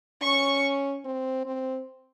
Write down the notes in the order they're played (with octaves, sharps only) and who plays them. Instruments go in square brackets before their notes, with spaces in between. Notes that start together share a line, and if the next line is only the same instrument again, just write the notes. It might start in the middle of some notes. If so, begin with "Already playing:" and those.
[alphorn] C#4 [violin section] C#6
[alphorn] C4
C4